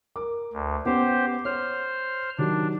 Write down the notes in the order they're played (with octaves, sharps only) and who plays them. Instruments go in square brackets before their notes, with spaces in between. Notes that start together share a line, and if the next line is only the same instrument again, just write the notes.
[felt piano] A#4 D6
[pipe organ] D2
[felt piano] B3 C#4 [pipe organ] G4 C5
[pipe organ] C5 F6 [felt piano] C#5
[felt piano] D#3 F#3 G4 [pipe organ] D4